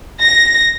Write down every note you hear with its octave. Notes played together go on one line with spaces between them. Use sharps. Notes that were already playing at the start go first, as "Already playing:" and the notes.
A#6